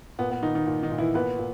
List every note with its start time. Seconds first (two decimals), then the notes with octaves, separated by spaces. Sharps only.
0.19 A#2 B3
0.30 B3
0.42 A#2 D#3 D#4
0.55 D#3 D#4
0.67 A#2
0.83 D#3 D#4
0.91 A#2
0.98 E3 E4
1.14 A#2 B3 B4
1.39 A#2